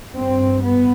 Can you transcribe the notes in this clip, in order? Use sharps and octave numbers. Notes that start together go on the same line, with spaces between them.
G2 C4
B3